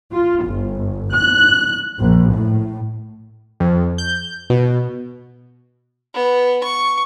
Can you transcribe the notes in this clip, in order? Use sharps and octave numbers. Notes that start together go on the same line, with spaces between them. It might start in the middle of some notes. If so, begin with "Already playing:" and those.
F4
G1
F#6
A#1
A2
F2
G6
B2
B3
C#6